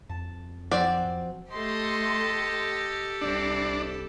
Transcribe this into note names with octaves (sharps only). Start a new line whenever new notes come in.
F2 A5
F3 C4 F#4 D5
A3 G4 A4 D#5 C6
C2 C4 D4